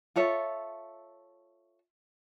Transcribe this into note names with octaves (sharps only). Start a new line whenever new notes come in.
F4 A4 C#5 E5